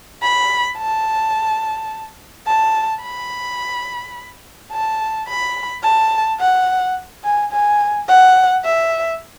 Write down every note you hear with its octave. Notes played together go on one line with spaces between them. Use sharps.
B5
A5
A5
B5
A5
B5
A5
F#5
G#5
G#5
F#5
E5